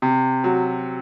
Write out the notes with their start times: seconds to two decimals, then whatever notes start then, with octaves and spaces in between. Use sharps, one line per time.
0.02 C3
0.44 F#3